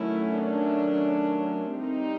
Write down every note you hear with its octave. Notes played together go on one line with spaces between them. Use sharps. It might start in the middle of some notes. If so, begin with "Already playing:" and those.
Already playing: D#3 F#3 A3 C#4 E4
D4
G3 C4 D#4